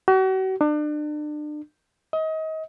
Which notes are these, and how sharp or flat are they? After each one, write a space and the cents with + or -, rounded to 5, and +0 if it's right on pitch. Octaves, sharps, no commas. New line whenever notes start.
F#4 +40
D4 +35
D#5 +30